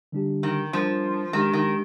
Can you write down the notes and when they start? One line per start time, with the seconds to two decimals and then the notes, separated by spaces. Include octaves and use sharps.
0.12 D3 G3 D4 G4
0.43 D#3
0.73 F3 G3 D4 F4 A#4
1.33 D#3 G#3 D4 G4
1.53 D#3